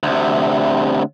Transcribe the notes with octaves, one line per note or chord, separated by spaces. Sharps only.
D2 C3